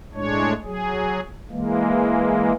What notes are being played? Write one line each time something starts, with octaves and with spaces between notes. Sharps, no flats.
A2 G#3 D4 C#5
F#3 G#4
E3 G#3 A#3